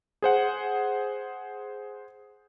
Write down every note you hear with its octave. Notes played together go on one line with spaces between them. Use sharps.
G#4 C5 F#5